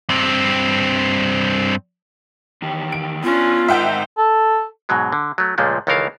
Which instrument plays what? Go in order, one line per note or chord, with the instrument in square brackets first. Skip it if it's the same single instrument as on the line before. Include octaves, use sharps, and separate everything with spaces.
[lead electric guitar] G2 C4
[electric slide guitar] E2 D#3 G4
[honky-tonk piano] D7
[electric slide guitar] B3 G#5 [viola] C#4 D4 [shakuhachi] F4
[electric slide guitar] G#2 A#4 [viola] D#4 C5 [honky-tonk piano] E5 F#5 G5
[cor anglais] A4
[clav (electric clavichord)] G#2 B2 F#3 G#3
D3
F#3 A3
C#2 A#2 F3 G#3 A3
C#2 D#3 E3 A4 A#4 F5